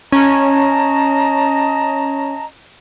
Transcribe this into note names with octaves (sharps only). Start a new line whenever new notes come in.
C#4 D#5 A5 A#5